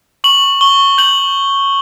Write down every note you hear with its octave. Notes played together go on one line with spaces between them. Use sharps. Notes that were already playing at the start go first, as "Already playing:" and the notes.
C#6 F#7
C#6 G7
G6 F#7